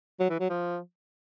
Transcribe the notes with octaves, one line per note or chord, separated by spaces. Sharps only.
F#3
E3
F#3
F3